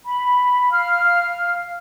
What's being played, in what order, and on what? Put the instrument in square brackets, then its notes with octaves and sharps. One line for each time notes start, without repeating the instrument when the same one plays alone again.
[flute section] B5
F5 F6